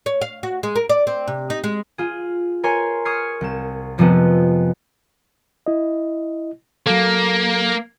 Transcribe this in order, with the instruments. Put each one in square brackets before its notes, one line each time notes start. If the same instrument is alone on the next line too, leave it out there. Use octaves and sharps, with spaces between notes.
[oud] C#5
F5
F#4
G#3
A#4
D5
C4
C3
D#4
G#3
[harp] F4 G#4
A#4 C#5 G#5 C6
C#6 D#6 F6 G#6 C7
C2 E7
F2 C3 F3 G#3 A3 B3
[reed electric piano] E4 D#5
[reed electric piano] F#3 A4 [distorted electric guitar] A#3